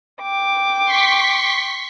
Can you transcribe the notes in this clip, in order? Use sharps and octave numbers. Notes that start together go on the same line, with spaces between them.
G5 D6
C6 C#6 B6